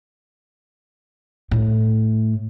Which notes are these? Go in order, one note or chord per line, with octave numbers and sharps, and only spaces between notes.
A2